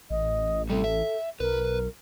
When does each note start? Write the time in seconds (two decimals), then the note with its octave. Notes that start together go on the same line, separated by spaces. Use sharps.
0.10 A1 D#5
0.70 G3 C4 A4
0.84 E5
1.40 B1 A#4 B4